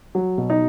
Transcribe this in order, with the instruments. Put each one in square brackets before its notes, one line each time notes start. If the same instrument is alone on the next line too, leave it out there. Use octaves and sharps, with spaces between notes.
[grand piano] F#3
B2
D#4